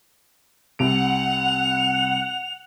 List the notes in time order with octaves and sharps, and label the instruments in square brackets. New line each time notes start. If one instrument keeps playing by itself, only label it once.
[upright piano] C2 C3 D7 [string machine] F#5 [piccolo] F7